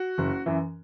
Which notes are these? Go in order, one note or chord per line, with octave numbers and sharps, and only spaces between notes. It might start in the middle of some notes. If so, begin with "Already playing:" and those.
Already playing: F#4
F#1
F#2 E3